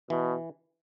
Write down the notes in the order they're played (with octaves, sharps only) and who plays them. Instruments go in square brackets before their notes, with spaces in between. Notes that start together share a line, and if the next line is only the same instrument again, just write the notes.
[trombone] B2 [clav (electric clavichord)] E3